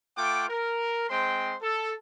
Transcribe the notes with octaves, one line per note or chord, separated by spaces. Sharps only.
A3 F4 F#5 G5 D6
A#4
G#3 C4 C5 G5 C6
A4